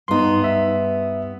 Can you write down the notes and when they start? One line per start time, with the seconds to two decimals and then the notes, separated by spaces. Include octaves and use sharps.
0.08 G2 B3 D#4 C6
0.44 E5